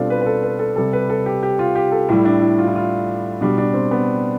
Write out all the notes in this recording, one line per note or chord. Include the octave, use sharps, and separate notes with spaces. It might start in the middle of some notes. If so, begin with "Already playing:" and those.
Already playing: B2 G3 C4 D4 F4 G4 A4
B4
B4
A4
B4
A4
C3 G3 A4
B4
A4
G4
G4
F4
G4
A4
A2 G3 E4
D4
E4
F4
E4
F4
B2 G3 D4
D4
C4
B3